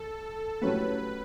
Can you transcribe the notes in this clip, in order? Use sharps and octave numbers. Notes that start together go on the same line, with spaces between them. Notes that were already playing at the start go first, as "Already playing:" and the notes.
Already playing: A4
A2 F#3 C#4 G4 B4